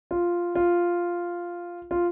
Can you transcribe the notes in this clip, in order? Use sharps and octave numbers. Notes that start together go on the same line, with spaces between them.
F4
F4
F4